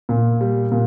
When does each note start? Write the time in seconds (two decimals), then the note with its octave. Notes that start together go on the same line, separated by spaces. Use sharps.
0.09 A#2
0.41 G3
0.72 A#2